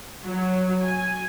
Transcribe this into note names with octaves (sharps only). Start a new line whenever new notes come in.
F#3
G#5